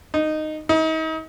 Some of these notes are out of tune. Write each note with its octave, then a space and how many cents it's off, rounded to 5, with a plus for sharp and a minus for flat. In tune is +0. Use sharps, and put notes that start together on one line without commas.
D#4 -10
D#4 +40